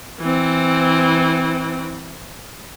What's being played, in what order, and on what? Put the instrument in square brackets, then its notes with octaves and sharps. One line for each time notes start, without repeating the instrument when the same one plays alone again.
[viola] E3 C4